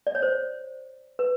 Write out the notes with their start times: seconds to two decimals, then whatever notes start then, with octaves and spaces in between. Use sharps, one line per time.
0.07 D5
0.15 C#5
0.23 C5
1.19 B4